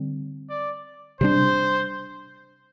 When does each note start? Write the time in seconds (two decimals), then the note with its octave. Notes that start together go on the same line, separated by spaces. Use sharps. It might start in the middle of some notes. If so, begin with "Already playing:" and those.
Already playing: D3 G3 C4
0.49 D5
1.21 C3 G3 D4 C5